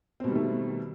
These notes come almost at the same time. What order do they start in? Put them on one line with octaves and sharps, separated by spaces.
C4 B2 G3 D#3 A3